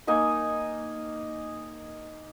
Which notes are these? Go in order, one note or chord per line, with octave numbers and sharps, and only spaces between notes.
A#3 D#4 D#5 G#5